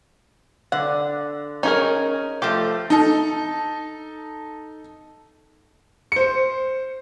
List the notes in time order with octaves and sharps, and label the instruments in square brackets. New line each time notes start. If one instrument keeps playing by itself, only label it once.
[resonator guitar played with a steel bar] D3 [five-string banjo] F#5
[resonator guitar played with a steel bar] C#4 [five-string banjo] D#4 G#4 A#4
[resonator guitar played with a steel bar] F3 A3 [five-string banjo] G4
[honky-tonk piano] D#4 A4
[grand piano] C5 C#7